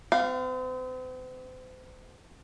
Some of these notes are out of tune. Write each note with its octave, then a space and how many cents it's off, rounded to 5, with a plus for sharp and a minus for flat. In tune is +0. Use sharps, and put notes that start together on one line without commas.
C4 -40 F5 +0